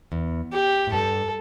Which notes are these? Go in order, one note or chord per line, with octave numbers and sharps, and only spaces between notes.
E2
G4
A2
G2 A4